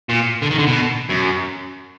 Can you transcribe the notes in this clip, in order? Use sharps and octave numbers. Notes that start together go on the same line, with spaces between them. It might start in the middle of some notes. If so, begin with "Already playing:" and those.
A#2
D3
D#3
D3
B2
F#2